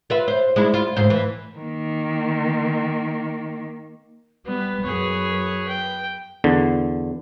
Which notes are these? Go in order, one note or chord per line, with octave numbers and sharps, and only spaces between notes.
F4 B4 E5
C5
G#3 D4 E4
F4
D2 G#2 C5
E3
D#3 A#3
G3 B3 B4
F#2 G#4 C#5
G5
E2 D3